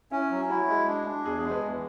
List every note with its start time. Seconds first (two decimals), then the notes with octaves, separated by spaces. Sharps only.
0.11 C#4 E4
0.31 F#3
0.50 E4 F#4
0.68 G#3
0.87 D4
1.07 D4
1.25 E2 G#4
1.39 G#4
1.44 G#3
1.51 B4
1.63 E2